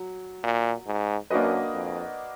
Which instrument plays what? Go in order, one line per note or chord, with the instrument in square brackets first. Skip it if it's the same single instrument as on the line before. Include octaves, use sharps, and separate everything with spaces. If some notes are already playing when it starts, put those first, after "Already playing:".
Already playing: [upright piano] F#3
[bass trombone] A#2
G#2
[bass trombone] F#2 [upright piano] A#3 D4 F#4 B4 D#5
[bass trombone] F2